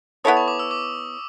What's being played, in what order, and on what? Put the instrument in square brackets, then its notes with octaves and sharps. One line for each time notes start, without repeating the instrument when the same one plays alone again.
[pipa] B3 E4 A4 C#5 [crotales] D#6
[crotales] C#6
D6
E6
D6